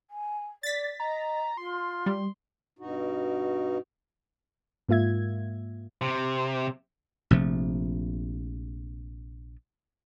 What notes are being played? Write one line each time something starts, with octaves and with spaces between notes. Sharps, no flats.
G#5
D5 A6 B6
D#5 A#5
F4 C6
G3
G2 B2 D#4 F#4
G#2 A#3 F4 E5 G#6
C3
A#1 C3 F3 A3